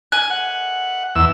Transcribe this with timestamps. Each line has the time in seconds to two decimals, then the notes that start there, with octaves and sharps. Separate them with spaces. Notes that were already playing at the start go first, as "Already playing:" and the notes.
0.12 G#5 F#6
0.30 F#5
1.15 E2 E6